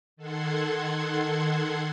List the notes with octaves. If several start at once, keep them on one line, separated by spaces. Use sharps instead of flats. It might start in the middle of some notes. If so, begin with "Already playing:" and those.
D#3 A4 F#5 C6 G#6